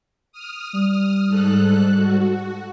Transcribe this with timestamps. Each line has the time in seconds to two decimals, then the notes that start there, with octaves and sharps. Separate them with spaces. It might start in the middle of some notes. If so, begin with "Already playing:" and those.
0.32 D#6 F6
0.73 G3
1.28 G#2 A4 F#6
1.96 F#4